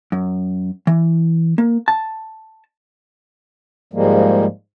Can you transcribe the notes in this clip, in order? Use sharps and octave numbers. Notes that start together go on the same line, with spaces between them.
F#2
E3
A#3
A5
G#2 F3 G3 G#3 A#3